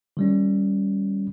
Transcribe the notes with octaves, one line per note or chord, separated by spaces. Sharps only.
D#3 G3 C#4